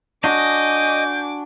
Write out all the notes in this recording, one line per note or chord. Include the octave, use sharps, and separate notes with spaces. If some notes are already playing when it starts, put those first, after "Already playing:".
D4 F#4 D#5 G#5 D6 G6